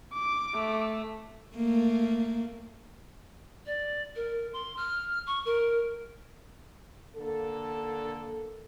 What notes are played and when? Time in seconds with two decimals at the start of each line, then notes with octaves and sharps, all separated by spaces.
0.13 D6
0.55 A3
1.56 A3 A#3
3.66 D5
4.15 A#4
4.53 C6
4.77 F6
5.27 C#6
5.45 A#4
7.17 D3 A#3 A4